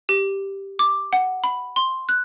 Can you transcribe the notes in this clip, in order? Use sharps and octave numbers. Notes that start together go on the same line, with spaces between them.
G4
D6
F#5
B5
C6
F#6